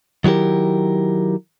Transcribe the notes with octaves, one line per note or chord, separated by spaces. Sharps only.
D#3 F#3 E4 G4 A#4